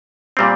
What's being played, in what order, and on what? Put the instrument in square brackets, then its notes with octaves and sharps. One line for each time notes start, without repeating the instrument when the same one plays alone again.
[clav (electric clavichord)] A#2 G3 C4